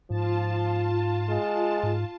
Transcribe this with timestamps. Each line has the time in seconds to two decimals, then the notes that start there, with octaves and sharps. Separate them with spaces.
0.10 G#2 F3 F4 A5
1.29 G#3
1.83 G#2